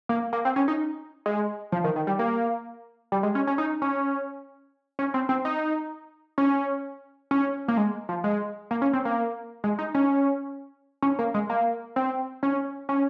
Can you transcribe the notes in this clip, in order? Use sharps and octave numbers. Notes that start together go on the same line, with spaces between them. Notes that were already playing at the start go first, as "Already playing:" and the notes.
A#3
A#3
C4
C#4
D#4
G#3
F3
D#3
D#3
G3
A#3
G3
G#3
C#4
C#4
D#4
C#4
C#4
C4
C4
D#4
C#4
C#4
A#3
G#3
F3
G#3
A#3
C#4
C4
A#3
G#3
D#4
C#4
C#4
A#3
G#3
A#3
C4
C#4
C#4